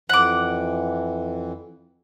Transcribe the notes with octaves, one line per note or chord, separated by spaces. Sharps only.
F2 E3 F#5 D6